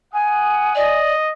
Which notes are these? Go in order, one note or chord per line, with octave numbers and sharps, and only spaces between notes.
F#5 G#5 D#6
D5 D#5